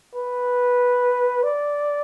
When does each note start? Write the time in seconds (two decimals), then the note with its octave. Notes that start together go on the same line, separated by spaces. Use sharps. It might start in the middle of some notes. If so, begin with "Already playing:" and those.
0.15 B4
1.43 D5